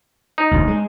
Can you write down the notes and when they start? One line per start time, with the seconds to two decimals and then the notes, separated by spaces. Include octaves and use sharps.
0.38 D#4
0.51 E1 D2
0.67 G#3